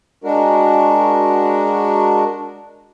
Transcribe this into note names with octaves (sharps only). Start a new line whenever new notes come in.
G#3 D4 F#4 A#4